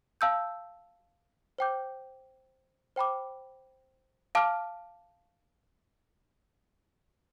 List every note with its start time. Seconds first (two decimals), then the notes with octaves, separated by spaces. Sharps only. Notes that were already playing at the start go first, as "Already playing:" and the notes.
0.21 F5 A5 E6 G6
1.58 C5 G5 D6 G6
2.96 C5 G5 B5 D6
4.35 F5 A5 D6 F6